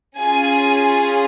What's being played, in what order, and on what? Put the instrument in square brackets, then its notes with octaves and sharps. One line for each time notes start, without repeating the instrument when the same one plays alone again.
[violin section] C#4 F4 G#4 G#5